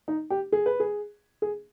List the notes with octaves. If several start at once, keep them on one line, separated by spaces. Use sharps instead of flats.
D#4
G4
G#4
B4
G#4
G#4